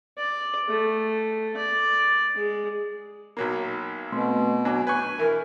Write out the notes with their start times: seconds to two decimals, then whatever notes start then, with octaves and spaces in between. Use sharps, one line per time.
0.18 D5
0.69 A3
1.57 D5
2.35 G#3
3.37 B1 F#3 A#3
4.12 B2 A3 C4 C6
4.65 F#3 D4 G#5 D6
4.87 B4 G#5 C#6 D6 G6 G#6
5.19 E3 A#4